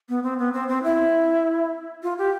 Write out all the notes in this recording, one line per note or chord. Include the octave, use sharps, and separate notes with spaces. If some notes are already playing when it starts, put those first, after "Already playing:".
B3
C4
B3
C4
C4
E4
F4
G4